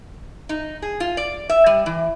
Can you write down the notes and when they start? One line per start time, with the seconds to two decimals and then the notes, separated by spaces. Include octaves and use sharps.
0.49 D#4
0.82 G#4
1.00 F4
1.17 D5
1.49 E5
1.66 G3
1.86 E3